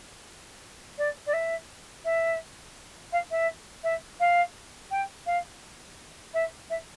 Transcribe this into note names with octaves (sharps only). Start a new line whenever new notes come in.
D5
D5
E5
E5
F5
E5
E5
F5
G5
F5
E5
E5